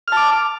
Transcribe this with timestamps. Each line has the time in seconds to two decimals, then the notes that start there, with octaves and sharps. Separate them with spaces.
0.08 F6
0.12 A5
0.17 D6